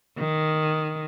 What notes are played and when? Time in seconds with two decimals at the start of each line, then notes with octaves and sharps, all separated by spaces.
0.19 D#3